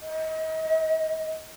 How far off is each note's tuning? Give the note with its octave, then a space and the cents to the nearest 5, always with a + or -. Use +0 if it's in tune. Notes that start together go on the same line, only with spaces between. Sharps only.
D#5 +35